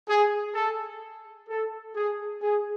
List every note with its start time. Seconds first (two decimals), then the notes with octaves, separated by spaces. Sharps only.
0.08 G#4
0.54 A4
1.49 A4
1.95 G#4
2.42 G#4